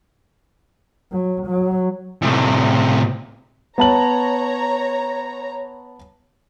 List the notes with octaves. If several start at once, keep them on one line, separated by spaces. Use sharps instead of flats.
F#3
F#3
A2 C3
B3 C#5 A5 A#5 F#7